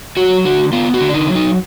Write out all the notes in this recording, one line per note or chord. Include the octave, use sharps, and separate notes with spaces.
F#3 F#4
D3 F#4
B3 F4
F#4
D3
D4
D#4
F#3
D#4